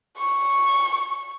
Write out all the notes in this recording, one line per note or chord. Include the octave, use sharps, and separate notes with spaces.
C#6